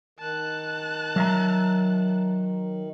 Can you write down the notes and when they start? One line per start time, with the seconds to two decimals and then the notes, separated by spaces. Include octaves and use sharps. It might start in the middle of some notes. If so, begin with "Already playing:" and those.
0.19 D#3 A5 F#6
1.16 F#3 E5 A#5